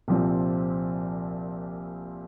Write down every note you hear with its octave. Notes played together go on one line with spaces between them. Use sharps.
C2 A#2 F3 C4